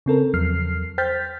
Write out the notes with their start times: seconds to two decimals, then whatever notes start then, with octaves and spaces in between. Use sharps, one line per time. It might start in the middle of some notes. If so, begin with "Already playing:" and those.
0.06 C#3 C4 A4 A#4
0.34 E2 F3 F#3 F6 C7
0.98 C5 G5 F6 G6 A6 B6